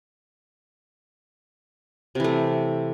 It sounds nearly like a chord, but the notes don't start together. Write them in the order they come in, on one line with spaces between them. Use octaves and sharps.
C3 E3 A3